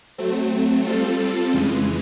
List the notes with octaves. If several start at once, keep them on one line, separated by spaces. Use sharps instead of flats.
F#3 A3 C4
G3 C4 F4 A4
F2 C#3 E3 G#3